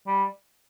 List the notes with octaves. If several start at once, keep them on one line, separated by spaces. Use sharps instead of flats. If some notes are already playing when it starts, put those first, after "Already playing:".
G3